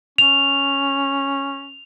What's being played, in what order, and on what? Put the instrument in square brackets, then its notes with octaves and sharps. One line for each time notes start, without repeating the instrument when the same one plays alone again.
[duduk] C#4 [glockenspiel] F7